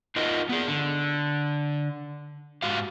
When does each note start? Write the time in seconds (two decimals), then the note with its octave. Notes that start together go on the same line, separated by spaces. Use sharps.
0.16 D#4 F4 F#4 A#4 D#5
0.49 B3 G#4
0.68 D3
2.62 G#2 F#4 G4 F5